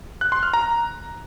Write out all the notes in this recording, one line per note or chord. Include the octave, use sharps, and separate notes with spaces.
F#6
C6
F6
A#5